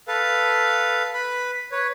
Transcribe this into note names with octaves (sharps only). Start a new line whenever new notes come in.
A4 B4 F5
B4 B5
B4 C#5